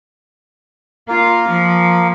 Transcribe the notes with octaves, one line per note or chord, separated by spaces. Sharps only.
A#3 F4 A#4
F3